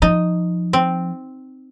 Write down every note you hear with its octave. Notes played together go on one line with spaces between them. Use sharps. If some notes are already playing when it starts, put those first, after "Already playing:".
F3 D#4
C4